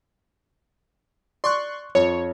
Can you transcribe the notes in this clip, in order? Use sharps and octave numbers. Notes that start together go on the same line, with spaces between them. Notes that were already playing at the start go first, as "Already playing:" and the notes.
D5 C6 C#6 F#6
F2 C#5